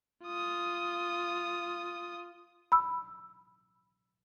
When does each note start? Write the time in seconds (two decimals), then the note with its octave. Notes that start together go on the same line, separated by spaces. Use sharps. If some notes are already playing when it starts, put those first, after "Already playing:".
0.25 F4 D#6
2.72 B5 E6